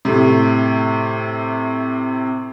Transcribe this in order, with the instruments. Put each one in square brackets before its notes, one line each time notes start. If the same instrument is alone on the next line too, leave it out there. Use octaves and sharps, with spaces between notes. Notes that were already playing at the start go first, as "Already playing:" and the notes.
[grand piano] A2 C3